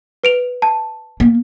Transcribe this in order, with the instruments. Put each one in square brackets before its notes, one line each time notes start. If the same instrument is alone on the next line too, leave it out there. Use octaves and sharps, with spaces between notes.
[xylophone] B4 D7 F7
A5
[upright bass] A#3